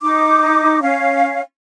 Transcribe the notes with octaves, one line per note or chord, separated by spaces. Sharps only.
D#4 D6
C#4 F5